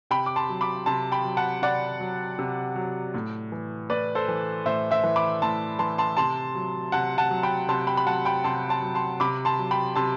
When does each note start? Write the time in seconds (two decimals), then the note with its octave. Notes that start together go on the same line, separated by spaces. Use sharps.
0.11 C3 G5 B5
0.26 D6
0.36 A5 C6
0.49 F#3
0.61 B5 D6
0.86 C3 A5 C6
1.12 G5 B5
1.24 F#3
1.37 F#5 A5
1.62 C3 D5 F#5
2.00 F#3
2.39 C3
2.76 F#3
3.14 A2
3.52 E3
3.90 A2 B4 D5
4.15 A4 C5
4.28 E3
4.66 A2 C5 E5
4.91 C5 E5
5.03 E3
5.16 B5 D6
5.42 A2 A5 C6
5.79 E3 A5 C6
5.98 A5 C6
6.17 C3 A5 C6
6.55 F#3
6.92 C3 F#5 A5
7.18 F#5 A5
7.31 F#3
7.43 G5 B5
7.69 C3 A5 C6
7.87 G5 B5
7.97 B5
8.06 F#3 F#5 A5
8.25 G5 B5
8.44 C3 A5 C6
8.69 A5 C6
8.82 F#3
8.95 A5 C6
9.20 C3 B5 D6
9.45 A5 C6
9.59 F#3
9.71 G5 B5
9.96 C3 A5 C6